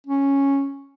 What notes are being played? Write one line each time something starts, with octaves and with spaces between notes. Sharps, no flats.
C#4